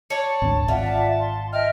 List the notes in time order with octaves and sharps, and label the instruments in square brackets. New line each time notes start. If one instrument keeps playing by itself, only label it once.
[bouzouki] C#5 D5 [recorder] A5
[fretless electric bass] G#1 D2
[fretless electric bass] G#1 [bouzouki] F4 [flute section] D5 E5 F#5
[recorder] A5
[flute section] C6
[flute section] D#5 E5 G5 [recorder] F6